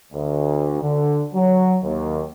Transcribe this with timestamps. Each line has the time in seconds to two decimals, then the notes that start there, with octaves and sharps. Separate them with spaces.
0.13 D2
0.82 D3
1.34 F#3
1.83 D#2